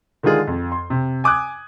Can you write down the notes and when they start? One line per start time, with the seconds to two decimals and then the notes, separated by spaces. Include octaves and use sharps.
0.23 D3 D#3 G#3 F4 G#4
0.47 F2
0.72 C6
0.90 C3
1.24 G#5 D6 D#6 F#6 G#6